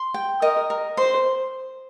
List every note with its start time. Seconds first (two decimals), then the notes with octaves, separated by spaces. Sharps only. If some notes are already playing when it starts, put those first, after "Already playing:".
Already playing: C6
0.14 G5
0.42 A#4 D#5
0.70 A#4
0.97 C5 C6